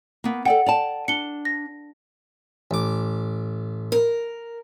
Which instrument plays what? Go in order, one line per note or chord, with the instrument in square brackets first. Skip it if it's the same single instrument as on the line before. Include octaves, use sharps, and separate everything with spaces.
[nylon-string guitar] A#3 B3
[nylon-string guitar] A4 D5 G5 [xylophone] F#5
[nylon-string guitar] D5 G5 A5 [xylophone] F7
[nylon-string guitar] D4 [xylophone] C#7 G7
[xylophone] A#6
[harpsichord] A1 D6
[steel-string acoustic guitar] A#4